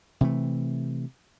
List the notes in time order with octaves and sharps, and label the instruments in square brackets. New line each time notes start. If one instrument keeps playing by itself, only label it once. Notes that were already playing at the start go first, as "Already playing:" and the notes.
[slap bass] C3 E3 A3